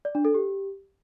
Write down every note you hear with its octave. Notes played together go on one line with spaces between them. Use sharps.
D5
D4
A4
G4